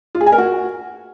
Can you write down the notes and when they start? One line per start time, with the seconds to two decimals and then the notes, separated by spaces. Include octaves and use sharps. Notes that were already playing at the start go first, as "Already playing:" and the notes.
0.15 F4
0.21 G#4
0.26 G#5
0.32 A#4
0.38 F#4